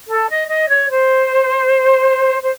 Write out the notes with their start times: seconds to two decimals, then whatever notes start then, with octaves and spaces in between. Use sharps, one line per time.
0.08 A4
0.29 D#5
0.48 D#5
0.68 C#5
0.89 C5
2.41 C5